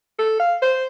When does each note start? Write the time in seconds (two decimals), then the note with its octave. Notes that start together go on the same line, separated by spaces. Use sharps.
0.19 A4
0.40 F5
0.62 C5